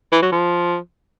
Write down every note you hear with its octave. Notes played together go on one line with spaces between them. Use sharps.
E3
F#3
F3